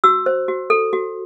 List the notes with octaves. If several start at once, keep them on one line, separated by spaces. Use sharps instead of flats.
F#4 E6
C5
F#4
A4
F#4